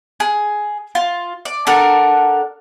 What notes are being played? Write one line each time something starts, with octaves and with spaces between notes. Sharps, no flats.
G#4
F4
D5
D4 A4 A#4 F#5